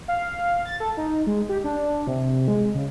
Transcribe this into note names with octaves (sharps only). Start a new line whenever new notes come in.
F5
A6
A4
D#4
G#3
G4
D4
C3
G#3
C#3